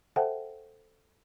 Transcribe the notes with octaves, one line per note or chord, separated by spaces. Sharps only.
A4 C5 E5 F#5 G5 A5